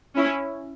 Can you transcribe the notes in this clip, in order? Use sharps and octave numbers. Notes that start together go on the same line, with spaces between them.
C#4 E4